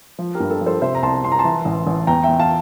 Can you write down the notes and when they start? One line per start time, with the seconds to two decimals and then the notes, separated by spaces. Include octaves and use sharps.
0.19 F3
0.35 G4 A#4
0.40 G2
0.50 A4
0.61 F3
0.66 A4 C5
0.81 C3 C5 E5
0.95 A#5
1.02 C2 A5 C6
1.23 C2 C6
1.32 A#5
1.39 A5 C6
1.45 E3
1.65 A1
1.87 A1
2.07 E2 G5 A#5
2.23 E2 E5 G5
2.39 F5 A5